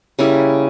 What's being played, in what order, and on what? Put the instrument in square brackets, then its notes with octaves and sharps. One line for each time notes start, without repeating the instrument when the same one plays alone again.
[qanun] C#3 G3 A#3 E4